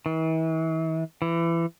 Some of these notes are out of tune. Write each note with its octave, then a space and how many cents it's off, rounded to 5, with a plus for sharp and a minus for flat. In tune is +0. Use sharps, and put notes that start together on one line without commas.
E3 -40
E3 +25